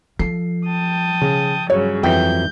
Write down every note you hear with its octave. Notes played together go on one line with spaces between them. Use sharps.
F3 A4 C7
G5 A5 D#6
C#3
G2 C#3 F#3 C#5
F2 E3 F#3 G5 G6